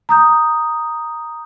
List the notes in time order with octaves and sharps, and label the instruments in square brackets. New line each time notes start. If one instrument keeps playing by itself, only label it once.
[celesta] A#5 D#6 G6